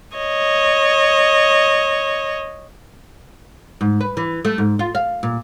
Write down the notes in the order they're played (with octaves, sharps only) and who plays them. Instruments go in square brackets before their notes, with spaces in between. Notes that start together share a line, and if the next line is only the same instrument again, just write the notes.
[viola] C#5 D#5
[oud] G#2
B4
E3
A3
G#2
F4
F5
A#2